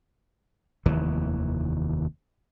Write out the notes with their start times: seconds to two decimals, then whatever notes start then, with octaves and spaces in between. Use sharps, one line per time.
0.86 F1 D#2 D#3 E3